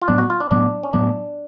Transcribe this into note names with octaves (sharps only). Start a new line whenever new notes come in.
F4
A2 F#3 B3 D4
F#4
F4
D4
A2 F#3 B3 D4
C#4
A2 F#3 B3 D4